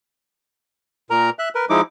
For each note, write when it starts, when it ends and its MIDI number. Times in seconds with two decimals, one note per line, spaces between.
1.10 1.30 46
1.10 1.30 70
1.10 1.30 82
1.39 1.49 76
1.39 1.49 90
1.55 1.65 70
1.55 1.65 71
1.70 1.81 53
1.70 1.81 56
1.70 1.81 63
1.70 1.81 64
1.70 1.81 86